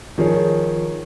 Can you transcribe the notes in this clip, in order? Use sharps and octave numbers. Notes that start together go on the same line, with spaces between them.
D#3 F3 G#4 C#5